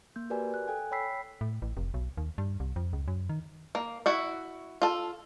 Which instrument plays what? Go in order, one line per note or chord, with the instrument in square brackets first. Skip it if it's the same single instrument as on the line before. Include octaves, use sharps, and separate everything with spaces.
[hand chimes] A#3 G6
F#4 G4 A#4 B4 D5 G#5
F#6
A4 G5 G#5
C#5 G5 B5 E6 B6 C7
[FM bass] A2
A1
F1
B1
D#2
G2
C2
F2
C#2
F#2
D#3
[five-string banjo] A#3
E4 F#4 E5
F4 A4